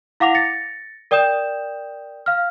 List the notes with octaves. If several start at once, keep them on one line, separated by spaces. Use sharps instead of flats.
E4 F5 F#5 D6 A#6 F7
A6 A#6 C#7
A#4 D5 G5 D#6 G6 E7
F5 F6